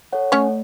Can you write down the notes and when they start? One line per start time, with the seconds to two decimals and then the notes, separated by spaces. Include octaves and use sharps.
0.13 A4 C#5 F#5
0.32 A3 C#4 C#5